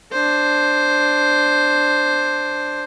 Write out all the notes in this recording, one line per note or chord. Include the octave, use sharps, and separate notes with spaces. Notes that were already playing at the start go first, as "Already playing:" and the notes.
D4 C5